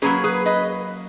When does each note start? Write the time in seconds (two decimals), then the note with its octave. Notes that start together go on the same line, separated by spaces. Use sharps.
0.02 F#3 A#3 C#4 G#4 B4
0.24 G#4 B4
0.46 B4 D#5